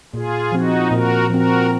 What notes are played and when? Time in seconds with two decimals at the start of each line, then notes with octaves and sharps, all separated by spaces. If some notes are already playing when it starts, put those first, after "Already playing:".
0.14 A#2 F4 G#4
0.52 F3 C4 D#4 F#4
0.91 A#2 F#4 A#4
1.30 F3 C4 F#4 A#4